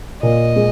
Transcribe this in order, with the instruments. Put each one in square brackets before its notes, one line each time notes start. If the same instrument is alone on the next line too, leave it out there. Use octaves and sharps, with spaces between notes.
[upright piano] A#2 [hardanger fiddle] D#5
[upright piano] G#3